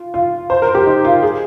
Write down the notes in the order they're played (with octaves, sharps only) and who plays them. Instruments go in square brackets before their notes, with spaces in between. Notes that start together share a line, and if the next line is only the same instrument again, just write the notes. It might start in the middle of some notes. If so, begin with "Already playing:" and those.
Already playing: [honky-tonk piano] F4
F4
C5
A#4
G4
D#4
F4
G#4